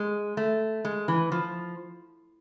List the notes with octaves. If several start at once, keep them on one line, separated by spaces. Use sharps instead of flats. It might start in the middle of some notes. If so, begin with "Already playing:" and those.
Already playing: G#3
A3
G#3
E3
F3